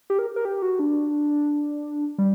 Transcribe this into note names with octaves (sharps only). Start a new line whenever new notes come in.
G4
A#4
A#4
G4
F#4
D4
G3